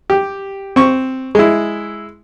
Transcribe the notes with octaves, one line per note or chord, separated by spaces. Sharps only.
G4
C4 C#6
G#3 E4